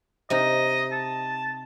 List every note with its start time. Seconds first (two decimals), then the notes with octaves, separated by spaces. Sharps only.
0.30 C3 D#4 D#5
0.92 A5